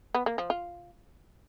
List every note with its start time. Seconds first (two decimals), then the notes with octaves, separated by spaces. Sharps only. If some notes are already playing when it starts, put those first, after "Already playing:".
0.15 B3
0.26 A#3
0.38 F3
0.50 F4